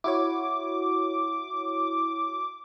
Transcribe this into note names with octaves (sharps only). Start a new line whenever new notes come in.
E4 F#4 C#5 D6